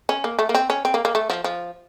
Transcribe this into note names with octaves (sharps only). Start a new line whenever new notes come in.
C#4
A#3
A3
A#3
C4
C#4
C4
A#3
A#3
A3
F3
F3